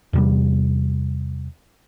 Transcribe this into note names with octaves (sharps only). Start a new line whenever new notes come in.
E2 C3 G3